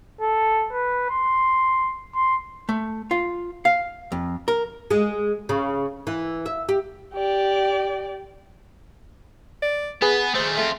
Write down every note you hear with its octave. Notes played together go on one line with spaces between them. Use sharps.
A4
B4
C6
C6
A3
F4
F5
F2
A#4
G#3
C#3
E3
E5
G4
G4 D5
D5
B3 G#4 B4
D#3 A3 C5
A3 C4 F4